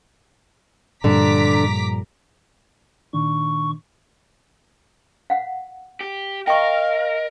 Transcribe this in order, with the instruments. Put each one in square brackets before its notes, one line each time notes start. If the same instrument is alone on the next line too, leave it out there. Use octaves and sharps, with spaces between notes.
[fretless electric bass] G2 [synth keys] A#2 F3 G3 [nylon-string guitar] D3 [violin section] A#5 D6 B6
[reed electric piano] A#2 D#3 D4 [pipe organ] C#6
[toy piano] F5 F#5
[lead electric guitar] G4
[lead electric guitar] A#4 [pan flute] D#5 [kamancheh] F5 [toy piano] G5 C#6